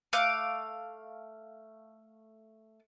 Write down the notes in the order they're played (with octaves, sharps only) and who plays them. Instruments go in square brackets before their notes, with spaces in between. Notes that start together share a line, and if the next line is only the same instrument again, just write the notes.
[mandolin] A3 F5 D6 F#6